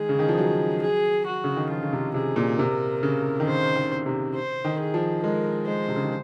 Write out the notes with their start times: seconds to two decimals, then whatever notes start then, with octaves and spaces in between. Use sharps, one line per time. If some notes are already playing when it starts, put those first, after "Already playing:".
Already playing: D#3 G#3 G#4
0.09 C#3
0.19 D#3
0.28 F3
0.38 F#3
0.82 G#4
1.26 F#4
1.44 C#3
1.57 D#3
1.70 F3 F4
1.83 C#3
1.93 C3
2.14 C3 G#4
2.36 A#2
2.59 C3 A#4
3.03 C#3
3.40 D#3
3.46 C#3 C5
3.76 D#3
4.06 C3
4.35 C5
4.65 D#3
4.79 G#4
4.94 F3
5.23 G#3 A#4
5.67 G#3 C5
5.88 C3
5.96 C#3
6.04 D#3